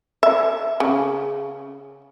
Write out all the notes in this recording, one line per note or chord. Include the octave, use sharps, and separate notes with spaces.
E5
C#3